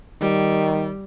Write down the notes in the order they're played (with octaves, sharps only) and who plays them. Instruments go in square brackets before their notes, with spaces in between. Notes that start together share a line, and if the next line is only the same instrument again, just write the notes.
[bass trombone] D#3 [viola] G3